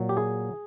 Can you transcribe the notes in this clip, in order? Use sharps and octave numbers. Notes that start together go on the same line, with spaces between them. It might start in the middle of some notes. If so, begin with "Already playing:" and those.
Already playing: A#2 F#3
G4
G#4